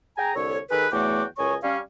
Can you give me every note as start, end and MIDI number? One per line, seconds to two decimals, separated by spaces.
0.18 0.31 68
0.18 0.31 79
0.18 0.31 80
0.18 0.31 82
0.35 0.59 36
0.35 0.59 50
0.35 0.59 69
0.35 0.59 73
0.69 0.88 51
0.69 0.88 68
0.69 0.88 69
0.69 0.88 71
0.92 1.24 40
0.92 1.24 54
0.92 1.24 57
0.92 1.24 66
0.92 1.24 79
0.92 1.24 86
1.38 1.55 37
1.38 1.55 42
1.38 1.55 73
1.38 1.55 75
1.38 1.55 80
1.38 1.55 85
1.63 1.78 55
1.63 1.78 61
1.63 1.78 77